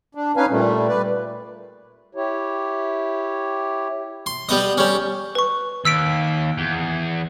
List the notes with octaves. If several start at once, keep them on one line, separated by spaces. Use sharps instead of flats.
D4
C#4 D#4 B4 F5 G#5
A#2 G3 A3
B4 D5
E4 G4 C#5
C6
G3 B3 D#5
G3 C#4
B4 C#6
D#2 E6 B6 D7
E2